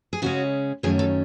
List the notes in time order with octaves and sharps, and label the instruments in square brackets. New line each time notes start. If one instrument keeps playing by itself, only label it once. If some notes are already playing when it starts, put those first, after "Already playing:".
[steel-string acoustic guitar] G#4
C#3 G#3 C#4 F#4
F#2 D#3 F#3 A3 C#4 G#4
A4